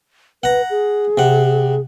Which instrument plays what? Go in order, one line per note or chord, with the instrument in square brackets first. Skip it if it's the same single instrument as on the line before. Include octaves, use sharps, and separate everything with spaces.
[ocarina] B4 [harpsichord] F#5 A#5
[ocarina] G#4
[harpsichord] C3 F#5